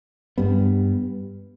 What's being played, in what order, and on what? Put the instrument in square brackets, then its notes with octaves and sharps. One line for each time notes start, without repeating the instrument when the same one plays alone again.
[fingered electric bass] G2 G3 B3